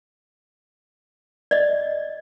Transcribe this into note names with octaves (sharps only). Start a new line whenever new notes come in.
D5 D#5